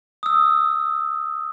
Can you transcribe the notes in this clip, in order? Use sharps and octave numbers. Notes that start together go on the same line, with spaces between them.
D#6 E6